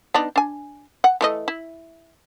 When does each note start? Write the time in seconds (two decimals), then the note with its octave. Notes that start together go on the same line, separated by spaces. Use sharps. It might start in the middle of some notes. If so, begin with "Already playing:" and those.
0.14 B3 D4 D#4
0.36 D4 G#5
1.04 F#5
1.21 E3 A3 D#5
1.48 E4